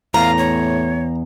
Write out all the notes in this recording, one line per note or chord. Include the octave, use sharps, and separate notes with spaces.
E2 A2 F5 A#5
C#5